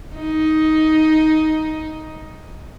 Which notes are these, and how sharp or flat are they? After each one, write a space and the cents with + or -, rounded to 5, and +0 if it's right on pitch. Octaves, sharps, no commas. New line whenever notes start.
D#4 +10